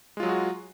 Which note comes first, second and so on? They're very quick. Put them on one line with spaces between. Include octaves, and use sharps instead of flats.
G#3 F4 F#3 G#4 F#4